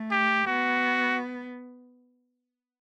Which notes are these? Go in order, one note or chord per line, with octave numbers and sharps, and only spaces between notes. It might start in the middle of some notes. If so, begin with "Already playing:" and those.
Already playing: A3
G4
B3 F#4